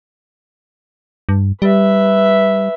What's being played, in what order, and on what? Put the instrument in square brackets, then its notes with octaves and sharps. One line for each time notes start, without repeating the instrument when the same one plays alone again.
[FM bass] G2
[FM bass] G3 [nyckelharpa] B4 E5